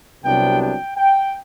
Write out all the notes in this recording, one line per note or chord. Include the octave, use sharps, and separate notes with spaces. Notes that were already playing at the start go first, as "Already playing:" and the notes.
C2 C3 F#3 B3 D4 G5
G5
G5